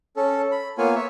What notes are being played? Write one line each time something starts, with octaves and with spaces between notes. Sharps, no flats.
C#4 A4
B5
A#3 B3 F4 C#5 G#5
C#5 E5